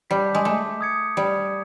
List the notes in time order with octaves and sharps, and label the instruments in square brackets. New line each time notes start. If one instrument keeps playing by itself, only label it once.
[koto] G3 [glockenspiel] A5 D6 G6 B6
[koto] G#3
A3
[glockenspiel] D#6 G#6 C#7
[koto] G3